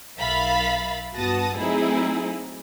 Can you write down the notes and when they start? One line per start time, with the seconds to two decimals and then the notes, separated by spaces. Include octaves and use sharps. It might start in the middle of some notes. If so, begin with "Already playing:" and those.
0.17 B1 A#4 E5 F5 B5 A6
1.14 G1 B3 F#4 A5 D#6 A#6
1.56 F#3 A3 C4 D#4 E4 G#4